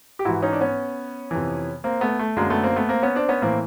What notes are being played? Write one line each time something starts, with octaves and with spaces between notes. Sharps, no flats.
G4
G#2 E3 E4 F#4
C#4 D#4
D4
B3 C#4
F2 C3 E3
A#3 C4
A3 B3
A3
F#2 D3 G#3 A#3
A3 B3
A#3 C4
A3 B3
A#3 C4
B3 C#4
C4 D4
B3 C#4
A2 E3 A#3 C4